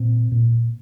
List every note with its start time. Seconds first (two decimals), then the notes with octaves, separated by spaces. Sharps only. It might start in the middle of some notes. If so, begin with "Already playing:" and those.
Already playing: A#2 C4
0.32 A#2